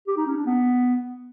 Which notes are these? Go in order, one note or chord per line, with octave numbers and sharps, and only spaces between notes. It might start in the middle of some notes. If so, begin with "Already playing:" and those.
G4
D#4
C#4
D4
B3